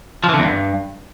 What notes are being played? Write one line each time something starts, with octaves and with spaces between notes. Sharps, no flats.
F3
E3
D3
E2
G2